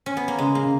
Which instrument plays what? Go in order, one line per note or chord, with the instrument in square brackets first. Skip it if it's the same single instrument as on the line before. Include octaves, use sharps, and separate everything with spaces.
[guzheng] C#4
B3
A#3
[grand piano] C#3 [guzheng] G#3
[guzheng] A#3
[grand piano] C#3